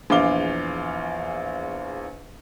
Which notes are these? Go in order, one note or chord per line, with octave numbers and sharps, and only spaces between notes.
A#1 E2 F5 D6 G7